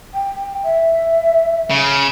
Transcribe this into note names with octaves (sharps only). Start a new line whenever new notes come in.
G5
E5
C#3